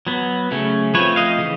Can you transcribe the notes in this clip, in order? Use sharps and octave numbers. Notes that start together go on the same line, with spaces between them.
F#3 B3
C#3 F#3 A3 C#4
F3 A3 C4 B4 C#5
D#5 F5
C#3 E3